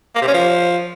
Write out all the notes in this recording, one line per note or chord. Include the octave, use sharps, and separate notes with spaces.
A#3
C3
C#4
F3